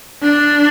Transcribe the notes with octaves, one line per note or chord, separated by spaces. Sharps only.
D4